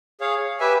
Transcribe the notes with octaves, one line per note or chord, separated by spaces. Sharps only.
G#4 C#5 F5
G4 B4 E5 G#5